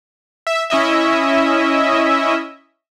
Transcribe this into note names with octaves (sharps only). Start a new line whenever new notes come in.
E5
C#4 E4 D#5 E5